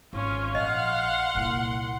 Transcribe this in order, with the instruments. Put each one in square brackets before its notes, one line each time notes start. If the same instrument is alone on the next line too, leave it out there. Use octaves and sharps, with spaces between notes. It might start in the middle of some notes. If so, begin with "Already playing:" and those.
[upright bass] G#1 [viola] C#4 F4
[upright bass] A#1 [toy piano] D#5 [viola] F5 [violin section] F#5 C6
[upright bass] C2 A#2